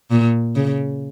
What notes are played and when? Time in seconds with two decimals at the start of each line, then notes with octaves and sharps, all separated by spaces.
0.11 A#2
0.56 C#3